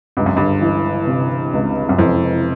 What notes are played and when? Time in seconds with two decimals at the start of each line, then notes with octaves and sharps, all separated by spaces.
0.17 C#2 G2
0.26 F#2
0.36 G1 G2
0.62 E3
1.07 C3
1.53 C#2
1.89 F#2
1.98 F2 E3